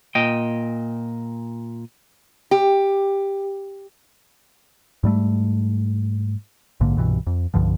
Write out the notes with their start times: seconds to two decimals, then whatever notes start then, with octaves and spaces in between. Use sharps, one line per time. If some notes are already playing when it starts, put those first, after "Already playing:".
0.15 A#2 D#5 G5
2.51 G4
5.03 G#2 G3 A3
6.80 A#1 G#2 D3 A#3
6.97 C2 G2 B2 E3
7.27 F2
7.54 C2 G2 D3 F3